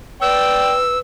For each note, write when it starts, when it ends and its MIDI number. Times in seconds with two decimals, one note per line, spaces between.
0.22 0.98 71
0.22 0.74 74
0.22 0.74 79
0.22 0.99 88